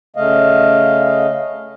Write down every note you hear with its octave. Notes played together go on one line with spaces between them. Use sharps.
C#3 A3 D#5 F5